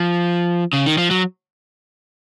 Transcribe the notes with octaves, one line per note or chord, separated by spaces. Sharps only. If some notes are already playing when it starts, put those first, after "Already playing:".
Already playing: F3
C#3
D#3
F3
F#3